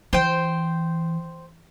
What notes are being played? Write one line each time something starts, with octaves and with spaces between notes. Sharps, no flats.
E3 C5 G5